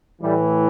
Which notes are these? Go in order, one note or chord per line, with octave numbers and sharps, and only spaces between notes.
A2 E3 G3